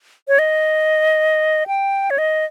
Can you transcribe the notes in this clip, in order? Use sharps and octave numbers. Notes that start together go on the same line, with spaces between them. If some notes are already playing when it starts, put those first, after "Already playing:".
C#5
D#5
G5
C#5
D#5